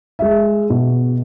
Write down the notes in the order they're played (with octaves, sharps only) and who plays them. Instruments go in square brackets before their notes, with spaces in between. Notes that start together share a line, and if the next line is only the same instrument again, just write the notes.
[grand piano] G#3 E5
B2